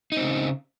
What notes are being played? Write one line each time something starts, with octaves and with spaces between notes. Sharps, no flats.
C#3 C4 D#4